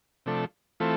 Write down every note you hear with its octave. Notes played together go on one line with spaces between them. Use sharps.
C3 F3 A3 D4 A4
E3 A3 C4 F4 A4